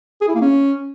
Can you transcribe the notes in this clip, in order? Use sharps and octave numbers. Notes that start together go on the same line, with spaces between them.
G#4
E4
A#3
C#4